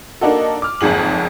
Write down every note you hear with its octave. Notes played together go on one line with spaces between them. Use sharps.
A#3 D4 D#4 F#4 A4
D6 F6
F#1 F2 G#2 G#4 F#7